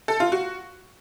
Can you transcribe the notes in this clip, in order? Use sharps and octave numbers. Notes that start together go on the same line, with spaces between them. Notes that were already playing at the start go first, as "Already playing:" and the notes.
A4
F4
F#4